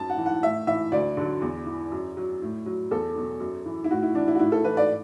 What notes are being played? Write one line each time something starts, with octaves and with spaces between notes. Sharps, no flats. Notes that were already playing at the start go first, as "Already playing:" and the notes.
Already playing: F#2 A5
F#5
E3
F#5
A2 E5
E3 E5
D2 D5
D3 F#3
E2
E3
F#2
F#3
A2
F#3
E2 A4
B2 F#3
F#2
E3
E4
A2 F#4
E4
E3 D4
E4
F#4
A2 E4
A4
E3 B4
D5